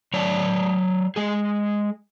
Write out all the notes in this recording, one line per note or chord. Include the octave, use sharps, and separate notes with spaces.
F#3 C#5 D5 A5
G#3 G#4